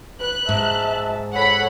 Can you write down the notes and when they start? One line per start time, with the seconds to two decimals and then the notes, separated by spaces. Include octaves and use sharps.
0.20 B4 F#6
0.49 G#2 E5 A5
1.34 A4 C#5 F#5 B5